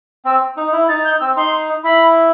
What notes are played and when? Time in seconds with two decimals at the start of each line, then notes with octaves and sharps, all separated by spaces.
0.25 C4 E6
0.57 D#4
0.73 E4
0.89 D#4 A6
1.05 G6
1.20 C4 E6
1.36 D#4 C6
1.83 E4 B5